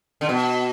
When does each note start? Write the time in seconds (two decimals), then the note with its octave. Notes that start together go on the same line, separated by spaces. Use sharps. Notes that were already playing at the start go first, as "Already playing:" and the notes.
0.21 D3
0.29 B2